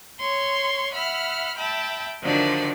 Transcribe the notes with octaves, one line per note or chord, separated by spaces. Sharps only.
C#5 C6 C#6
E5 F#5 B5 F6
E5 G5 A5 B5
D3 D#3 F3 F#3 D4